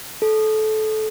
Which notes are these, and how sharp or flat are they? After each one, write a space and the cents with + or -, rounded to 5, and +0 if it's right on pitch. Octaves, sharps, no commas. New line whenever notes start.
A4 -20